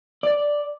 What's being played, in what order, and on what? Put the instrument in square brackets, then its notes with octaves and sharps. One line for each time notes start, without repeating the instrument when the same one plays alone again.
[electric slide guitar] D5